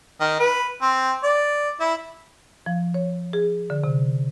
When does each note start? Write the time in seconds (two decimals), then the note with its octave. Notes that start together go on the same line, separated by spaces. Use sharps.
0.20 D#3
0.39 B4
0.82 C4
1.23 D5
1.80 E4
2.66 F3
2.94 C#5
3.33 G#4
3.70 D3
3.84 C3